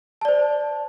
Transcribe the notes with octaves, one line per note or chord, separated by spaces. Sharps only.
C5 D5 A5